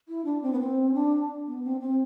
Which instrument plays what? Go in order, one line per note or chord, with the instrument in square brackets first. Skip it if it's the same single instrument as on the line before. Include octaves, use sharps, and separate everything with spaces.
[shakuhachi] E4
D4
C4
B3
C4
D4
B3
C4
C4